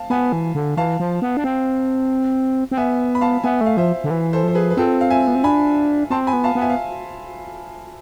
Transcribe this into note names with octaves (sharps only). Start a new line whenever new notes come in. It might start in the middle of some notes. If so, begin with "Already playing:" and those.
Already playing: F5 A5
B3 G#5 B5
E3
D3
E3 F5 A5
F3
B3
D4
C4
C4
B3 E5 G#5
B5
F5 A5
B3 E5 G#5
A3
F5
F3 C5 E5
D3
E3
A4 C5
F3 C5
G#4 B4
B4
C4 F4 A4
F5
E5 G#5
B3
C4
D4 G#5 B5
C4 A5 C6
G#5 B5
B3
F5 A5
B3
E5 G#5
F5